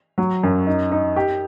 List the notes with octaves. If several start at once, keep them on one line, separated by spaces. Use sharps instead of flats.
F#3
F#2
D#4
D#4
G4